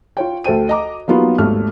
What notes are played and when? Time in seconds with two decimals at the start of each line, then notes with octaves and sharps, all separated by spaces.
0.17 F4 C#5 G5
0.44 D2 A4 C5 G5 D#7
0.69 D#5 A#5 D6
1.08 F#3 G3 A#3 B3 D#4 F4
1.38 G#1 D#2 A3 F6